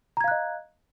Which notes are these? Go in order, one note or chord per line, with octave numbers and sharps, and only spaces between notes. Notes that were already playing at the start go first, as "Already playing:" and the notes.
D#5 F5 A#5 F#6 G#6